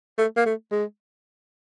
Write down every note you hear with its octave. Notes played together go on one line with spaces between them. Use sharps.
A3
A#3
A3
G#3